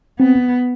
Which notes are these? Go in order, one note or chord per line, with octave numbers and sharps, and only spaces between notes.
B3 C4